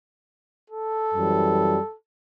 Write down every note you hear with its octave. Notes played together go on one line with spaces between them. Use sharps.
A4
F#2 E3 G3